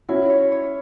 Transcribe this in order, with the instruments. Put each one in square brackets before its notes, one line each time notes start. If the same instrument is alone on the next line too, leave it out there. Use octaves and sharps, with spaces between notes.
[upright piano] C#4 E4 [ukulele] F#4
[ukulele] C#5
C#5